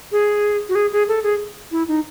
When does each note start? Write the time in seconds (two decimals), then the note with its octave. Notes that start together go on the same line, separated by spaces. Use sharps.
0.12 G#4
0.69 F#4
0.75 G#4
0.92 G#4
1.08 A4
1.23 G#4
1.72 E4
1.88 D#4